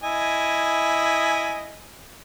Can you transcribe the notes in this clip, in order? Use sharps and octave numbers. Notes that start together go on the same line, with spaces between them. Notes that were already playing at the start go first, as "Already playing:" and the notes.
E4 D#5 G#5